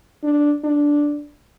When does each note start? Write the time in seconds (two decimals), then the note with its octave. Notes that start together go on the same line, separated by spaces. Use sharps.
0.23 D4
0.64 D4